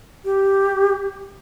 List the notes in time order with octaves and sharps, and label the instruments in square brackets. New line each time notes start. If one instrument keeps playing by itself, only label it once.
[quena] G4